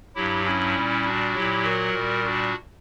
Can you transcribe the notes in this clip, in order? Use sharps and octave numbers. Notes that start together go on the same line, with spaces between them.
G2 F#3 E4 G4
C#4 E4
A#2 G3
D4 F#4
A#2 F#3 E4 G4
F#4 A#4
A#2 G3
D4 F#4